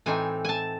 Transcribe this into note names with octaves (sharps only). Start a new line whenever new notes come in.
A2 E3 C4 D#4 G#5
G#5 A5